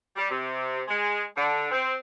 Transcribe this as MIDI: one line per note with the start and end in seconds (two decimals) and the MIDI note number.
0.16 0.29 55
0.29 0.81 48
0.88 1.23 56
1.36 1.66 50
1.71 1.94 60